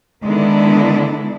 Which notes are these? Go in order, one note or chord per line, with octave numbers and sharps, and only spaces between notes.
D3 D#3 G#3 B3 D4 E4